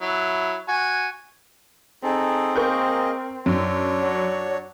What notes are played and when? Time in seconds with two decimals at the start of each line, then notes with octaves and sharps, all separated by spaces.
0.01 F#3 E4
0.68 F#4 G#5
2.04 C4 D#4 G#4 A4
2.56 A#3 G#4 A#4 D#5 C#6 G6
3.46 F#2 D4 C#5
3.99 F#3